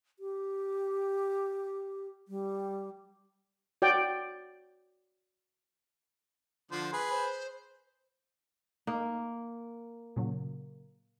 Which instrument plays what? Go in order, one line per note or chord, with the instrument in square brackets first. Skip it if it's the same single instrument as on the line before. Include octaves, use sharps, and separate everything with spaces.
[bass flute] G4
G3
[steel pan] F#4 D5 G5
[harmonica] D3 F3 C5
G#4 B4
[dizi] C5
[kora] A#3 [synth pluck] D#4
[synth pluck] A#2 C#3 F#3